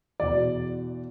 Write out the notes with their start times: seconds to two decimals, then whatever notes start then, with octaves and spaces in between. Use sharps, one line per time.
0.20 E2 B2 D5